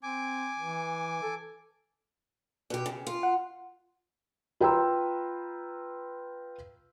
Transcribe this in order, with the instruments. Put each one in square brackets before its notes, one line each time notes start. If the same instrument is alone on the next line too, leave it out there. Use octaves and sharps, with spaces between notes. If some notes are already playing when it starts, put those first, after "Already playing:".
[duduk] C4 [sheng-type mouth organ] G#5 D6
[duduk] E3
A4
[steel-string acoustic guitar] B2 G4
C#3
F4
[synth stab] F#5
[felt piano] F4 B4 G5 A#5 C6 E6